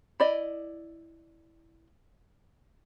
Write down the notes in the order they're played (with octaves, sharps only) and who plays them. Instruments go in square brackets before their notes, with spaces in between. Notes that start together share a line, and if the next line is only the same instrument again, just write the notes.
[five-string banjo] E4 D5 D#5